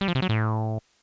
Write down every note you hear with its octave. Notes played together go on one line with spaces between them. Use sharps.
G3
F3
C3
F#3
A2